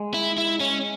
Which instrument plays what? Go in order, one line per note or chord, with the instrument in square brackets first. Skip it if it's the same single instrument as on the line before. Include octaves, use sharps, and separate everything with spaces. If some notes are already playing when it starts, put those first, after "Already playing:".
Already playing: [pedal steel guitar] G#3
[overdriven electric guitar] E4
E4
C#4